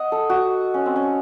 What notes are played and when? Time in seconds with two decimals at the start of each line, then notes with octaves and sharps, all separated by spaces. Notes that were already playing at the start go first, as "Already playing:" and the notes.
Already playing: D#5 F#5
0.12 A4
0.30 F#4
0.74 C#4
0.86 C4
0.96 C#4